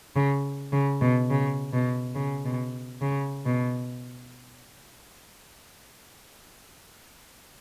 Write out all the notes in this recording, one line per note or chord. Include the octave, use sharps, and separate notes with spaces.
C#3
C#3
B2
C#3
B2
C#3
B2
C#3
B2